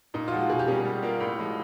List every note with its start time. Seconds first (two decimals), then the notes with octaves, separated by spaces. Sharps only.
0.14 A#2 D#4
0.28 F4
0.31 F3 G#3 F#4
0.50 B2 G#4
0.59 G4
0.68 G3 A#3 C#4 G#4
0.85 G3
1.03 A#3 D4 F4 A#4
1.20 A2
1.39 F3 G#3